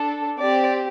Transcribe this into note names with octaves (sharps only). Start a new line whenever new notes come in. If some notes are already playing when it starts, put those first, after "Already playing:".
Already playing: D4 A4
C4 G4 D5